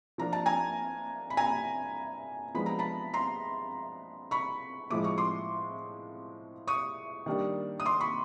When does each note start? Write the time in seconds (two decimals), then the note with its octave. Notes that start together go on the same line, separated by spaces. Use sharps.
0.18 F3 A#3 D4 A#5
0.33 A5
0.46 G#5 A#5
1.30 B5
1.37 G#5 A#5
2.54 F3 G#3 B3 D4 B5
2.66 A#5
2.79 A5 B5
3.14 A#5 C6
4.31 B5 C#6
4.90 A2 F3 G#3 D6
5.04 C#6
5.18 C6 D6
6.67 C#6 D#6
7.26 D#3 G3 A#3 D4
7.80 D#6
7.85 C6 D6
8.00 B5 C#6